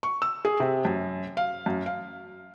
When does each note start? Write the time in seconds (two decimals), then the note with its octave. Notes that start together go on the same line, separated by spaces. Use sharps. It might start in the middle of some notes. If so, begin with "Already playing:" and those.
0.03 C#6
0.22 E6
0.45 G#4
0.60 C3
0.85 F#2
1.37 F5
1.66 F#2
1.86 F5